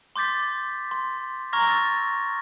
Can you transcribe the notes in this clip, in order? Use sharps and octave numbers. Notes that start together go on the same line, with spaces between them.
C6 D6 G6 A6 B6
C6
A#5 C#6 F6 G#6 A#6
E6 A6